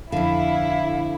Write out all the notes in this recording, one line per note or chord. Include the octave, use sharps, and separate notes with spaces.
F2 D3 E4 F5